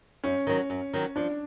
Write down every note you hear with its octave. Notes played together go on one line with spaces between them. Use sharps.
F#2 C#4
D#3 F#3
F#2
D#3 F#3
F3 D4